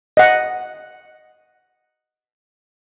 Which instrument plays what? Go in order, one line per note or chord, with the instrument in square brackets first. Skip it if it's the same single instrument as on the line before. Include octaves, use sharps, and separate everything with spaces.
[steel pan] D#5 F#5